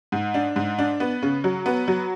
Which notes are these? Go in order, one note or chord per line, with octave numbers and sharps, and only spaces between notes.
G#2
D4
G#2
D4
B3
C#3
F#3
B3
F#3